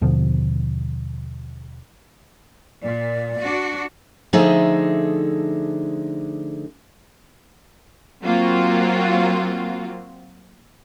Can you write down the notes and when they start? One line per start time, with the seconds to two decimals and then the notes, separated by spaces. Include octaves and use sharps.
0.01 D#2 B2 D3 F3
2.82 A#2 D5
3.40 D4 F#4
4.33 D3 F3 A3 D#4 G#4 E5
8.24 F#3 A#3 C4 F4 F#4